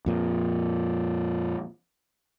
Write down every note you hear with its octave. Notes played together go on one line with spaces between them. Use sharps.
F2 A#2